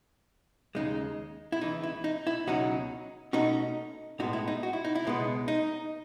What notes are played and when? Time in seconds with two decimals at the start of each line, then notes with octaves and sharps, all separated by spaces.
0.75 D#2 C#3 G#3 D#4
1.52 E4
1.61 C#2 C#3 E3 D#4
1.83 E4
2.04 D#4
2.27 E4
2.47 C#2 B2 F#3 C#4 D#4 F#4
3.33 B2 A3 C#4 D#4 F#4
4.19 B1 A2 G#3 B3 D#4 F#4
4.33 E4
4.48 D#4
4.63 F#4
4.73 E4
4.84 D#4
4.95 E4
5.05 C#2 B2 G#3 B3
5.48 D#4